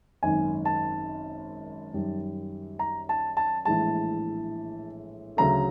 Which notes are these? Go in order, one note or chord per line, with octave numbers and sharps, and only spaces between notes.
G#1 F#2 D#3 G#5
A5
F#2 D#3 G3
A#5
A5
A5
A#1 A2 E3 G#3 A5
D2 C#3 F#3 A3 A#5